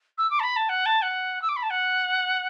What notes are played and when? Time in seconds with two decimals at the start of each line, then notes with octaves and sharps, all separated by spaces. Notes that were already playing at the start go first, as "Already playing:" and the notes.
0.18 E6
0.31 D6
0.40 A5
0.43 B5
0.56 A5
0.69 F#5
0.86 A5
1.02 F#5
1.42 E6
1.49 D6
1.56 B5
1.63 A5
1.70 F#5